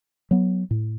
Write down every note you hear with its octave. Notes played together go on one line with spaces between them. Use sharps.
F#3 B3
A2